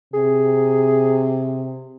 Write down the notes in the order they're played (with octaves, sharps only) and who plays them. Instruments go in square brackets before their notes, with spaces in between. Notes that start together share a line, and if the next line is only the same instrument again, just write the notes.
[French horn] C3 [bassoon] G#4